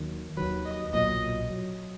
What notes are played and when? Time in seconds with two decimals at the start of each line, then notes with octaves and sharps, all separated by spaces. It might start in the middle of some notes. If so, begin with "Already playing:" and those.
Already playing: D#2 D#3 F#3
0.37 D#2 D#3 F#3 B4
0.65 D#5
0.93 B1 A#2 F#3 D#5
1.50 F#3